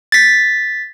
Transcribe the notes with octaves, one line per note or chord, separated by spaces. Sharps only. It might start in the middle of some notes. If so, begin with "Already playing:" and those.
A6 B6